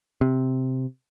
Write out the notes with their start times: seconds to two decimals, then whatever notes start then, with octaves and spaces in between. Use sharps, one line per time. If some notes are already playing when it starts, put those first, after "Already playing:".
0.21 C3